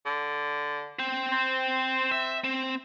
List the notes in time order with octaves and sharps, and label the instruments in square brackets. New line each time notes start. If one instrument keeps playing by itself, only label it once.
[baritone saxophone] D3
[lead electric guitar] C5 G5
[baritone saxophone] C4
[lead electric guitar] E5
C4